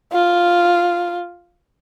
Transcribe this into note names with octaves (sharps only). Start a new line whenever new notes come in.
F4